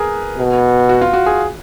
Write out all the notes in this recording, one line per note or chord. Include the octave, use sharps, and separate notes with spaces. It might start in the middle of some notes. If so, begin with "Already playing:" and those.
Already playing: G#4 A#4 B4
B2
F#4
F4
F#4
G#4